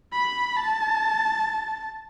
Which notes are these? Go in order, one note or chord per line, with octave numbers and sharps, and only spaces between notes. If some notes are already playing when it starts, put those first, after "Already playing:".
B5
A5